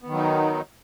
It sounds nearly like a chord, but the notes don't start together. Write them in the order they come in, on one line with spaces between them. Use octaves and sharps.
B3 D#3 F#3 D#4